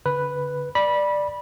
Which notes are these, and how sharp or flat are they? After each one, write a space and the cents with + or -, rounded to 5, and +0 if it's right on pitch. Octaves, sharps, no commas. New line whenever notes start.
D3 -40 B4 +0
D5 +10 B5 -20